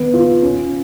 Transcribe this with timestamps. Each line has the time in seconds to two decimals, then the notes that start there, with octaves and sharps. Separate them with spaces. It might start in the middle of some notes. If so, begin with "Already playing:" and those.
Already playing: D#3 B3
0.13 F4
0.43 C#4